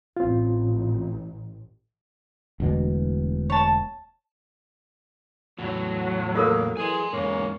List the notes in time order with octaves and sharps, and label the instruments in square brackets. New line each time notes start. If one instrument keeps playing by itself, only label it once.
[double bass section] A1 [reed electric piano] C4 F4
[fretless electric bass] E1 D2 B2
[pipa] C#5 A5
[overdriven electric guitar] E2 A2 [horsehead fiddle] F#3
[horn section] A#3 [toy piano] F4 A4 A#4
[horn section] E3 G#4 [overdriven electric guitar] G#5 C6
[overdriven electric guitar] E2 G#2 [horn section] G#3 A#3 C#4